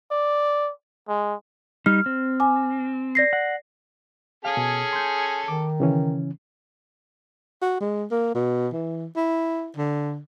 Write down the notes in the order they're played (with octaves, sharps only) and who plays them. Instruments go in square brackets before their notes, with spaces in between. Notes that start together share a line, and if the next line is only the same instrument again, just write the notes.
[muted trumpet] D5
G#3
[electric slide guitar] G3 D#4 [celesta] F6
[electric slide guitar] C4
[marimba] G#5 D6
[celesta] D5 A#6 C7
[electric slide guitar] F#5
[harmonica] C#4 G#4 A4 [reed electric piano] F5
[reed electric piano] B2
C6 G6
[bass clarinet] D#3 [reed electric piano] D6
[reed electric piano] C#3 E3 C#4
[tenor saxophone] F#4
G#3
A#3
B2
E3
E4
D3